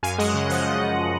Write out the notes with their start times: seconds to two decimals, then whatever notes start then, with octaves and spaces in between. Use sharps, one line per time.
0.03 F#2 F5 G#5
0.18 G#3 D#5 F#5
0.34 C#3
0.49 F3 D#5 F#5